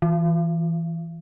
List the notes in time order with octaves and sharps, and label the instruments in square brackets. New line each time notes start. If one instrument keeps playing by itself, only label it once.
[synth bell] E3